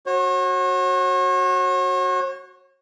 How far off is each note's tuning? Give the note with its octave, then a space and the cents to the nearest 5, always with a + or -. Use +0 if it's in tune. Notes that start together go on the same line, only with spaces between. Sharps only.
F#4 +0 C#5 -40